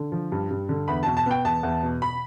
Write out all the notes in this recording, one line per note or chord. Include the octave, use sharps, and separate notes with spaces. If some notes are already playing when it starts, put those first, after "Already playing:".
Already playing: D3
F3
G2
G2
D3
E2 B5
B2 A5
A5
B3 G5
E2 A5
E2
B2
B5